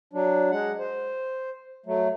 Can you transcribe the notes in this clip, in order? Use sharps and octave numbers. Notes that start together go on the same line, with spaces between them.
F#3 D4
G#3 F#5
C5
F#3 A3